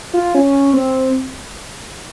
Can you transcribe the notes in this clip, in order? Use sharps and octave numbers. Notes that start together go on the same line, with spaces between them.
F4
C#4
C4